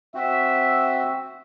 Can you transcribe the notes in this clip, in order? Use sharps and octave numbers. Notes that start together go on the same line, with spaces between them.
C4 F#4 E5